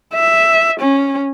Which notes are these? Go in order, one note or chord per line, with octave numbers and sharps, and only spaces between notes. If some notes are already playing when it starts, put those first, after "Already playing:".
E5
C#4